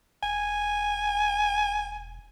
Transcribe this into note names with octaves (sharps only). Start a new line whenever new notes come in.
E1 G#5